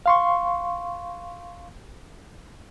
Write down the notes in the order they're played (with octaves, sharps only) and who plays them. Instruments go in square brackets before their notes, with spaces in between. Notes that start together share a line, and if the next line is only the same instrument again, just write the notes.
[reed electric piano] F5 C6 C#6